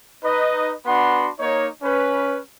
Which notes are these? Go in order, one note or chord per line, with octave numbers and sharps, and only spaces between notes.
D#4 B4 D#5
B3 D4 F#4 F#5 B5 C6
A#3 D#4 C#5
C#4 B4